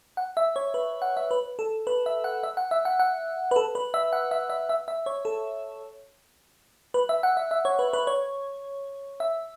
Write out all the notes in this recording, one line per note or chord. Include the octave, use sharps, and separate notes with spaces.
F#5
E5
C#5
B4
F#5
E5
B4
A4
B4
E5
F#5
E5
F#5
E5
F#5
F#5
B4
A4
B4
E5
F#5
E5
E5
E5
E5
C#5
A4
B4
E5
F#5
E5
E5
C#5
B4
B4
C#5
E5